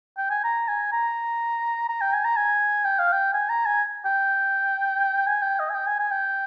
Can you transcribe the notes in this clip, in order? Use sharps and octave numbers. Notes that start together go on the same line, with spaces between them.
G5
G#5
A#5
G#5
A#5
A#5
G5
G#5
A#5
G#5
G5
F5
G5
G#5
A#5
G#5
G5
G#5
G5
D#5
G#5
G5
G#5
G#5
G5